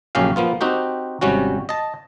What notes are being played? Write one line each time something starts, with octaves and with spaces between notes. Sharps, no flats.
A#1 F#2 C#3 C#4 G4 F5
F3 A#3 B3 F4
C4 D#4 F#4 G4
G#1 C3 G3 C#4 F#4
D#5 A5